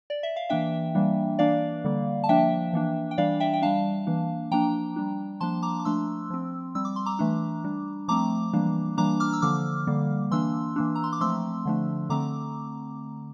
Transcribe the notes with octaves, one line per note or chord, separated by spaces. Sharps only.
D5
E5
F5
E3 A#3 D4 E5 G5
E3 G3 A#3 D4
E3 A#3 D4 D5 F5
D3 G3 A#3
A5
F3 A#3 D4 E5 G5
E3 A#3 D4
G5
E3 G3 D4 D5 F5
E5 G5
G5
G3 D4 F5 A5
E3 A#3 D4
F3 A#3 D4 G5 A#5
G3 D4
F3 A#3 D4 A5 C6
A#5 D6
D6
F3 A3 D4 C6 E6
F3 C4
G3 C4 E6
D6
C6
A#5 D6
E3 A3 D4
G3 D4
F3 A3 C4 A#5 D6
E3 G3 A#3 D4
E3 G3 A#3 D4 A#5 D6
D6 F6
E6
D3 F3 A#3 D6 F6
D3 G3 A#3
E3 A#3 D4 C6 E6
E3 A#3 D4
A#5
C6
D6
F3 A3 C4 C6 E6
D3 F3 A3 D4
D3 A3 C4 A#5 D6